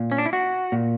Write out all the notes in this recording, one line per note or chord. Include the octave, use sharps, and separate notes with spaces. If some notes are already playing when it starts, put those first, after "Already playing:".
Already playing: A#2
C#4
D4
E4
F#4
A#2